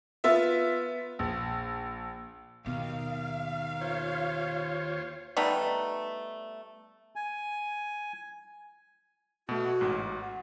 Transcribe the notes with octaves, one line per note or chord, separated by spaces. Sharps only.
B3 F4 E5
A#1
D#2 B2 F5
F4 C5 C#5
G3 A3 B3 D#4
G#5
B2 A3 F#4
A1 G#2
F#5